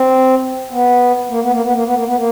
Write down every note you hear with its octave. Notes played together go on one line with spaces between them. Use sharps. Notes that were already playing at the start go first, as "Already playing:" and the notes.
Already playing: C4
B3
A#3
B3
A#3
B3
A#3
B3
A#3
B3
A#3